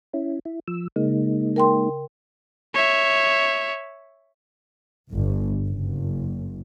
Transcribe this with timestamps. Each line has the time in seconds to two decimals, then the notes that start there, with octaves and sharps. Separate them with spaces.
0.13 C#4 E4
0.45 E4
0.68 F3 E6
0.96 C#3 G#3 A#3 D#4
1.56 A#4 G5 C6
2.74 C#5 E5
5.13 G1
5.65 F#1